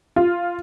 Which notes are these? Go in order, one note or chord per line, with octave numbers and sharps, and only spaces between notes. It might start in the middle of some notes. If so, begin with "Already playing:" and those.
F4